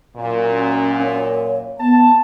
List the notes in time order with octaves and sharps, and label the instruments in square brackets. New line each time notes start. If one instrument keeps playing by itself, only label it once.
[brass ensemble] F#2 A#2
[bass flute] C#4
C#5
[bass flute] B3 [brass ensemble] A5